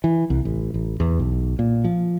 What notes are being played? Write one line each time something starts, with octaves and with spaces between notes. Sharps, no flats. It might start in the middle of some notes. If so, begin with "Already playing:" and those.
E3
C2
A1
A1
E2
B1
A#2
F3